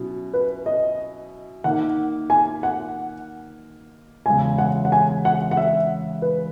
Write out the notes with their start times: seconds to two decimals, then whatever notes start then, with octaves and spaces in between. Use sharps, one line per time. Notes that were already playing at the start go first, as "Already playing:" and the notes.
Already playing: B2 F#3 C#4 E4
0.34 B4
0.66 D#5
1.64 D#3 A#3 D#4 F#5
2.30 G#5
2.63 F#5
4.26 E2 C#3 G#3 C#4 G#5
4.58 F#5
4.85 F#5
4.92 G#5
5.25 F#5
5.51 F#5
5.57 E5
6.22 B4